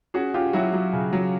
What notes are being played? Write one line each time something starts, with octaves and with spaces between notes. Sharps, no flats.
C#4 F#4 G#4
C#4 F4 G4
F#3 E4 F#4
F#3
C#3
F#3